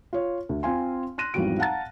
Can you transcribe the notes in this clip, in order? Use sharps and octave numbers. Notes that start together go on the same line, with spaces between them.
F4 C#5
D2
C4 F4 F5 G#5 C6
C6 F#6 A#6 D#7
G#1 E2 F3 G3 F#4 D7
F5 F#5 A5 A#5 A6